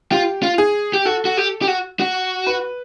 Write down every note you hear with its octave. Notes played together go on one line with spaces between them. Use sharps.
F4 G4
F4
G#4
G4
F#4 A4
F#4
G4
G4
F#4
F#4
B4